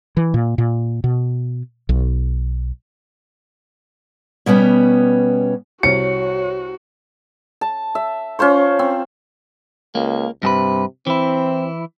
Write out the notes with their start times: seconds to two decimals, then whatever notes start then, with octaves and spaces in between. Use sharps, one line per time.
0.17 E3
0.34 A#2
0.58 A#2
1.04 B2
1.89 B1
4.46 B2 G3 B3 C#4
5.83 C2 F#4 C#5 C#7
7.61 A5
7.95 E5
8.39 C#4 F4 C5 C#6
8.79 C4
9.95 C#2 A#3
10.43 G2 C3 G#4 B4
11.07 E3 C4 E4